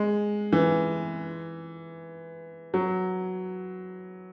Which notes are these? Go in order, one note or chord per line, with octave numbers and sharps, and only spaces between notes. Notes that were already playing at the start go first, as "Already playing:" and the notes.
Already playing: G#3
E3
F#3